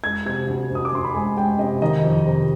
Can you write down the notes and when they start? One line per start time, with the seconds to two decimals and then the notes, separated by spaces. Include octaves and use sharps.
0.04 G#3 G#6
0.26 C3 G#6
0.48 D2
0.70 D2 D#6
0.85 D6
0.93 D2 C6
1.05 B5
1.15 G#3 G#5
1.37 G#3 G5
1.59 C3 D#5
1.82 D#3 D#5
2.04 F2
2.26 C3